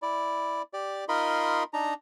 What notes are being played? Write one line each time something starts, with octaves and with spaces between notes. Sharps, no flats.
E4 D5
G4 D5
D#4 F4 A#4 D#5 B5 C6
D4 D#4 A#5